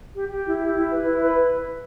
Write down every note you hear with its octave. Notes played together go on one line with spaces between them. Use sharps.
G4
G4
E4
G4
E4
B4
E4
B4